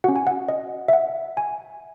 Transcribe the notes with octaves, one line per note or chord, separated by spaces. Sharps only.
C#4 F#4 F#5
G#5
F#5
D#5
E5
F#5
G#5